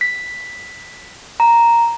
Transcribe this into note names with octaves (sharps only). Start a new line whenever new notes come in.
B6
A#5